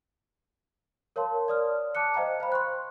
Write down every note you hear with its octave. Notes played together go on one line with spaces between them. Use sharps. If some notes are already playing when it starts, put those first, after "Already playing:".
A#4 C#5 F5 A5 C6
D5 D#6 F6
A5 D6 F#6 C#7
C5 D#5 F5 G5 A#5
C5 F5 B5
C6 C#6 F#6